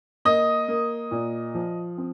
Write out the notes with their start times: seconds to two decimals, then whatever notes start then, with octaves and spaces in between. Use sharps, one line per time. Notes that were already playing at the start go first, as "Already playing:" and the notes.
0.25 A#3 D#5 D#6
0.68 A#3
1.11 A#2
1.54 F3
1.98 C4